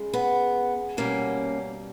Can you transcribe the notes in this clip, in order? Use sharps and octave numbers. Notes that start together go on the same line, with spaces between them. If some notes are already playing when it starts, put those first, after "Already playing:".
Already playing: C#3 G#3
B3
B2 G3 A#3 C#4